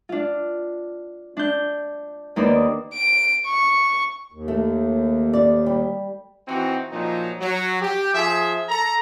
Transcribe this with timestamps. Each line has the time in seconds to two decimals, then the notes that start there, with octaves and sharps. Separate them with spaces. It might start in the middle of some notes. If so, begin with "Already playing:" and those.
0.09 D4 F4
1.37 D4 G6
2.36 D#2 A#3 B3 D#4 C5 D5
2.94 D7
3.46 C#6
4.32 D#2
4.48 A3
5.33 D5
5.66 G3
6.48 E3 C4 D#4 F#4
6.92 A#2 F3 F#3 D#4
7.40 F#3
7.81 G4
8.14 F3 G#4 E5
8.69 A4 A#5